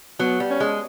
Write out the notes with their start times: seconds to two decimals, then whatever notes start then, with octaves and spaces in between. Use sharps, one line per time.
0.19 F#3 B3
0.40 G3
0.50 C#4
0.60 G#3